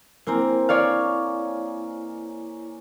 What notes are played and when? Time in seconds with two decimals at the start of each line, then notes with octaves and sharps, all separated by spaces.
0.27 A#3 C4 E4 G#5 A#5
0.69 C#5 D5 F5